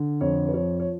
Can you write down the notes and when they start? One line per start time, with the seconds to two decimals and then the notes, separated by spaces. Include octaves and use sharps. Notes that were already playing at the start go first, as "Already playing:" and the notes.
Already playing: D3
0.21 F2 C#5
0.49 B4
0.53 F3 C#5
0.80 C#5